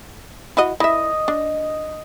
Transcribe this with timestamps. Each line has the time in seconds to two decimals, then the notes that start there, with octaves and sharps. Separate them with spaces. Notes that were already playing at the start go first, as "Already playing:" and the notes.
0.57 E4 F#4 D#5
0.80 E4 D#5 E5
1.28 D4